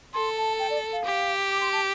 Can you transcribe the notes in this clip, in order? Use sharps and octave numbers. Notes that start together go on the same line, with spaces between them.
A4 C6
A5
G5
D5
F5
G4
D6
C6
A5